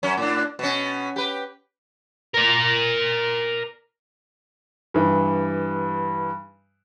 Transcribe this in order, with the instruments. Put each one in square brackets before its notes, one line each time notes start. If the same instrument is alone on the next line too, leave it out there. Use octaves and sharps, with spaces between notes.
[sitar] F#2 C#4
A2 D4
B2 C#4
G4 B4
[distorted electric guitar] A#4 D5
[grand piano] G2 E3